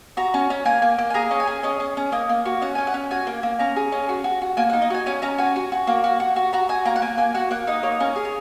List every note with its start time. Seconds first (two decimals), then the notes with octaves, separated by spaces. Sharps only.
0.17 F#4 A#5
0.34 C#4
0.50 C#4
0.65 A#3 G#5
0.82 A#3
0.98 A#3
1.10 G#5
1.14 G#4 A#5
1.31 C#4
1.40 G#5
1.47 G#4
1.63 C#4 D#5
1.80 C#4
1.97 C#4
2.12 A#3 D#5
2.29 A#3
2.45 F#4
2.62 C#4 F#5
2.75 C#4 G#5
2.87 F#5
2.94 C#4
3.11 F#4 G#5
3.27 A#3
3.43 A#3
3.59 C#4 A#5
3.76 G#4
3.92 C#4
4.09 F#4
4.24 F#4
4.42 F#4
4.57 A#3 G#5
4.70 F#5
4.73 D#4
4.82 D#5
4.90 F#4 G#5
5.06 C#4 G#5
5.22 C#4 A#5
5.38 F#4 G#5
5.56 F#4
5.72 F#4
5.87 A#3
6.04 F#4
6.20 F#4
6.36 F#4
6.53 F#4 A#5
6.69 F#4 G#5
6.85 A#3 A#5
6.96 F#5
7.02 A#3 G#5
7.18 A#3 G#5
7.34 F#4 F#5
7.51 A#3 F#5
7.67 D#4 D#5
7.83 A#3 C#5
8.00 C#4 A#4
8.16 G#4
8.25 C#5